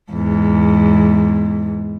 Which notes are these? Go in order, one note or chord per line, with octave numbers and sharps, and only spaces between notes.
E2 G#2